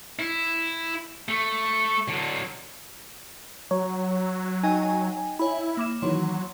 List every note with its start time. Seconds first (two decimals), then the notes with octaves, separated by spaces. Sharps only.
0.19 E4
1.29 A3
2.09 D3 F#3
3.71 F#3 C#5 A#5
4.63 D#4 D#5 G5 G#5
5.39 E4 C#5 B5
5.77 A#3 D6 E7
6.02 D#3 E3 F#3 C#5 C6